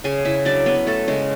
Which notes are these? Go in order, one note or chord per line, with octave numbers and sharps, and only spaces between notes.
C#3 G#4 G#5
C#3 E4 E5
F#3 D4 D5
B3 C#4 B4
A3 C#4 A4
C#3 G#3 G#4